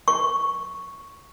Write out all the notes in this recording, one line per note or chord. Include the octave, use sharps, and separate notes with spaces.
C#6